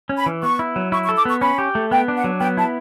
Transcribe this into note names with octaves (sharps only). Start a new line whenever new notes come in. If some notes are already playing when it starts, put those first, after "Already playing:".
C#4
B5
E3
B3 C#6
E4
F#3
E4 C#6
C#6
A4
D6
B3 C#6
C#4 B5
G4
A3
B3 G5
D4
F#5
F#3
B3 G5
E4 A5